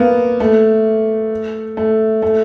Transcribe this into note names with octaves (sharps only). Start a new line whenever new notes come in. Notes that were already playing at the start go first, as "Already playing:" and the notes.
Already playing: A#3 B3
A3
A3
A3